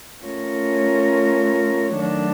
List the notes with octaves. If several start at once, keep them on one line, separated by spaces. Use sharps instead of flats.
A3 C#4 F4 A#4 C#5
D#3 F#3 A3 D4